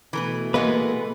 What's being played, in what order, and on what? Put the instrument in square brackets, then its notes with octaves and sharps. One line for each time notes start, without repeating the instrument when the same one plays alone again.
[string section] B2 A3 [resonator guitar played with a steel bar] E3 A#4 B4
[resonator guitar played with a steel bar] E3 G#3 B3 [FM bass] A#3 [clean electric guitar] B4